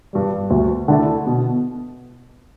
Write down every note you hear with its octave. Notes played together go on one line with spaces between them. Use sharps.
G2 G3
D2
D3 A3 E4 A4
B2